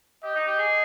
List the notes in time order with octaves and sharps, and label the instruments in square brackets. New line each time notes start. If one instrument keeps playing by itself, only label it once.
[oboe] G4 [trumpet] D#5
[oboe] D#4
G4
G#4